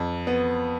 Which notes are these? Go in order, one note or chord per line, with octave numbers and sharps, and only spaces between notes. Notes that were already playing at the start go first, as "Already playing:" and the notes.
Already playing: F2
B3